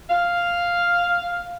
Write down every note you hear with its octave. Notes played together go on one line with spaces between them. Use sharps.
F5